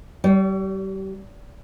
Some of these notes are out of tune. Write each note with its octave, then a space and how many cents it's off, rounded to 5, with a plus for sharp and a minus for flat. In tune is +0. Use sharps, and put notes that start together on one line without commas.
G3 -30 C#5 +40